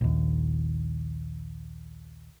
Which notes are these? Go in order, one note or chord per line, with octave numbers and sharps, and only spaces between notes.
A#1 D#2